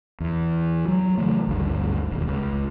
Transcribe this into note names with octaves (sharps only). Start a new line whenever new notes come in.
E2
F#3
C#3 E3 F#3 A3
G#1 D2 G2
E1 D#2
C#2